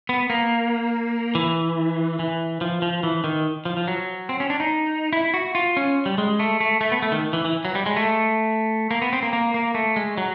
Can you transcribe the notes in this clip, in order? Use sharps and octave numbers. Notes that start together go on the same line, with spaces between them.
B3
A#3
E3
E3
F3
F3
E3
D#3
F3
F3
F#3
C4
C#4
D4
D#4
E4
F#4
F4
C#4
G3
G#3
A3
A3
A3
B3
A3
D#3
E3
E3
F#3
G3
G#3
A3
A#3
B3
C4
A#3
A#3
A#3
A3
G#3
F#3